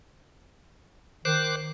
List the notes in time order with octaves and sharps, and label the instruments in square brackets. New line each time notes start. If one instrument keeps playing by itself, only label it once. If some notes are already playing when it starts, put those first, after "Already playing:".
[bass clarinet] D#3 [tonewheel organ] C5 D6 F#6